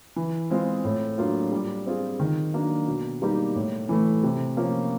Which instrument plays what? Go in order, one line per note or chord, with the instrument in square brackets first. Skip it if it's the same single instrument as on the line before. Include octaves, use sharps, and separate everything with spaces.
[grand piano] E3
G#3 C4 F4 G#4
A2
F#3 A#3 D4 F4
G3
C4 F4 G#4
D#3
F#3 A#3 D4
B2
G3 A#3 D#4 G4
A2
E3 A3
C3
F3 A#3 C#4